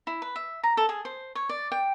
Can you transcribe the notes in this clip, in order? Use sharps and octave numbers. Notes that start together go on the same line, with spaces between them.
E4
B4
E5
A#5
A4
G#4
C5
C#5
D5
G5